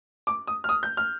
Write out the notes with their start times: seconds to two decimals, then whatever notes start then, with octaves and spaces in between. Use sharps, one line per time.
0.27 D6
0.47 D#6
0.64 F6
0.69 D#6
0.83 G6
0.97 F6